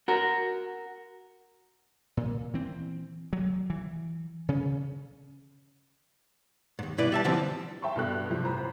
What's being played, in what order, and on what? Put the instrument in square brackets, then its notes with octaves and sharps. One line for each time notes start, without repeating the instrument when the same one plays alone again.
[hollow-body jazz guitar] F#4 A#4
[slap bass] A#2
E3 C4
F#3
E3
C#3 C#4
[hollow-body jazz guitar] D#2 G#2
G2 B2 E4 B4 D5
G3 E5 A5
D3 E3 F3 G3 C4 D4
[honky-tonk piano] E5 G5 A5 C6 C#6
G2 B2 A4 F#6
F2 C3 F3
A1 C5 A#5 B5